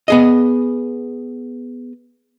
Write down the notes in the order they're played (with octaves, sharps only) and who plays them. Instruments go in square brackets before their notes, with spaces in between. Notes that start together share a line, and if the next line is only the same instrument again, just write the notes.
[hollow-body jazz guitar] B3 G#4 D#5